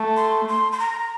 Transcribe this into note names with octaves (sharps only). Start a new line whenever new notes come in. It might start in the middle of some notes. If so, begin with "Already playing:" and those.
Already playing: A3
C6
C6
C6
A#5